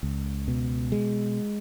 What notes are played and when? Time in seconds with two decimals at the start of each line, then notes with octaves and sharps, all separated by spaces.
0.03 C#2
0.48 B2
0.92 G#3